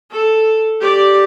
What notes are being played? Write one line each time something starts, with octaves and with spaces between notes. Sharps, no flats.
A4
G4 D5